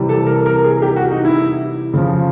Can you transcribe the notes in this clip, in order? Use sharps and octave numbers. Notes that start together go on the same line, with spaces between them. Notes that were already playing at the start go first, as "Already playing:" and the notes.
Already playing: C3 E3 G3
A4
A#4
A#4
G#4
G4
F#4
D#4
E4
C#3 F3